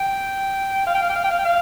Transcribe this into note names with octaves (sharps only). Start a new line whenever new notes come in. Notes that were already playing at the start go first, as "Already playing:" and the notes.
Already playing: G5
F5
G5
F5
G5
F5
G5
F5
G5
F5